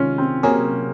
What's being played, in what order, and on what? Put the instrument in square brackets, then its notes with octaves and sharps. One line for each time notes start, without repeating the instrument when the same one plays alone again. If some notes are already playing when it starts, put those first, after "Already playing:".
Already playing: [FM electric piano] C3 D#3 G#3 [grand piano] C#4 F4
[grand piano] C4
[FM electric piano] C3 F#3 C#4 G#4 [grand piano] A#3